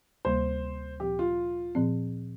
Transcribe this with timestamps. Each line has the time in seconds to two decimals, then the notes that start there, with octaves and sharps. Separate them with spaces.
0.25 D2 C3 G3 A#3 C5
1.00 A#2 F3 C4 G4
1.19 F4
1.75 A#2 F3 C4